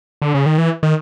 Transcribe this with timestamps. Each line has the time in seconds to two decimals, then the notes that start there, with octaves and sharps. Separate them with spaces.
0.22 D3
0.34 C#3
0.46 D#3
0.58 E3
0.83 D#3